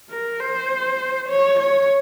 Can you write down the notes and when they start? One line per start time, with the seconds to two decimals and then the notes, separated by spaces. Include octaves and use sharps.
0.10 A#4
0.40 C5
1.29 C#5
1.60 C#5